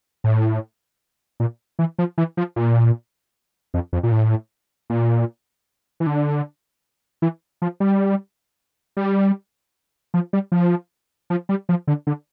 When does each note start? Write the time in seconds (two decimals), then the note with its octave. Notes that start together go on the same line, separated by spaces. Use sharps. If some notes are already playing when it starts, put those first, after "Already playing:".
0.24 A2
1.40 A#2
1.79 E3
1.99 F3
2.18 E3
2.37 F3
2.56 A#2
3.74 F2
3.93 F2
4.03 A#2
4.12 A2
4.90 A#2
6.00 E3
6.07 D3
7.22 E3
7.62 F3
7.80 G3
8.97 G3
10.14 F3
10.33 G3
10.52 F3
11.30 F3
11.49 G3
11.69 F3
11.87 D3
12.07 D3